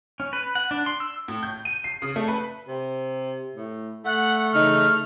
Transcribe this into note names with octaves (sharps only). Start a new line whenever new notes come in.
C#4
B4
F#5
D4
C6
E6
A2
G6
D#7
C7
C#3
A3
B4
C3
A2
A3 F#5
C#3 E3 D#4 F6